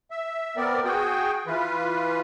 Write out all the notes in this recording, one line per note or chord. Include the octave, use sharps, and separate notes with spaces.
E5
B3 C4 A#4 D5
F#4 G#4 G5
E3 F4 B4